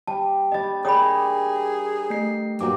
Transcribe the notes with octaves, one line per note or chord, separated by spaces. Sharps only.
G3 A5
G3 D4 D#5 A6
G#4 A#4 C#5 D5 G5 B5 D#6
A3 C7
G2 A#2 F#3 D#4 D6